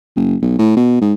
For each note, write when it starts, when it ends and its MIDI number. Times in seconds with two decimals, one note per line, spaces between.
0.16 0.36 30
0.42 0.57 35
0.58 0.74 45
0.76 1.01 47
1.01 1.14 44